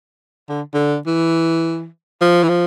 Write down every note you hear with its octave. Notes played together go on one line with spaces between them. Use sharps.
D3
D3
E3
F3
E3
F3